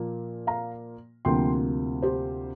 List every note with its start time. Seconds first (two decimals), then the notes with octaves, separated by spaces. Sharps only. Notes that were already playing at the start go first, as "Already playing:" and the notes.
Already playing: A#2 F3 A#3
0.47 F5 A#5
1.25 D2 C3 F3 A#3 G5 C6
2.03 G4 C5